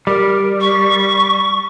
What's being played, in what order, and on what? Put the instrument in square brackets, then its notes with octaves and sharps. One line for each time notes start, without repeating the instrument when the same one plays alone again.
[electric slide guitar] G3 [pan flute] A#4
[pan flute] C#6